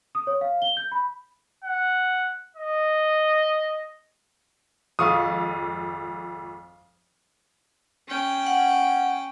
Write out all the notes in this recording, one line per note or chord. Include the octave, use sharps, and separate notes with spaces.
D#6
C#5
F5
G7
G6
B5
F#5
D#5
G#1 F2 F5 C#6 D#6
C#4 G5
F#5